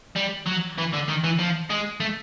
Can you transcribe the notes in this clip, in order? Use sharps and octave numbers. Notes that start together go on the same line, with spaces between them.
G3
F#3
E3
D3
D#3
E3
F3
G#3
A3